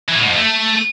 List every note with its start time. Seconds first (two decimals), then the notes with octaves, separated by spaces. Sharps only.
0.08 E3
0.15 A2
0.22 G#2
0.29 F2
0.36 A3